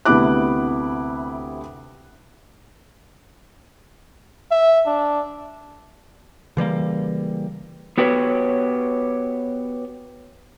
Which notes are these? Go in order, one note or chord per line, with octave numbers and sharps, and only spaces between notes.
D2 C3 B3 E4 D6 F#6
E5
D4
C#3 E3 G3 A#3
B3 F#4 G4 B4 C#5